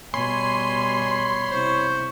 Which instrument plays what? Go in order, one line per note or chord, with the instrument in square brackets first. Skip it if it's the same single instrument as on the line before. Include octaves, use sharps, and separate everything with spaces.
[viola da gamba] B2 G3 [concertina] C#5 B5 [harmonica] G#5 [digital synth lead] C6
[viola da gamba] C3 E4 [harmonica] C5 C#6